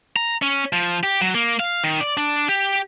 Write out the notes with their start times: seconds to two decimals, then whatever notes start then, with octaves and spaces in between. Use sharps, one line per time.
0.16 A#5
0.42 C#4
0.73 F3
1.03 G4
1.21 F#3
1.35 A#3
1.60 F5
1.84 D#3
2.00 D5
2.17 D4
2.49 G4